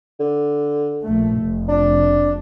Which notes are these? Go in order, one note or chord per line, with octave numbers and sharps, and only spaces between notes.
D3
A#1 A3
F1
D4